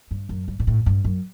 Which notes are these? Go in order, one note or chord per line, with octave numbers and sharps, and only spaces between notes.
G2
F#2
G2
A#2
A2
G2
F#2